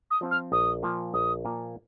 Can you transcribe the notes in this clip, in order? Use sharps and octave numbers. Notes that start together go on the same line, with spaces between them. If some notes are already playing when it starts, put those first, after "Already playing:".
D#6
F3 C4 F4
F6
A#1 D#6
A#2 F3 A#3 F4
A#1 D#6
A#2 F3 A#3 F4